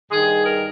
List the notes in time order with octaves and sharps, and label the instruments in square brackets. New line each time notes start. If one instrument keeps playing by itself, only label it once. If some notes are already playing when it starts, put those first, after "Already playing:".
[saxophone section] G2 D#3 G#4
A#4